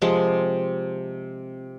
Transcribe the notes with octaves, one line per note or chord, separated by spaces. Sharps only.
C3 F3 G#3 C4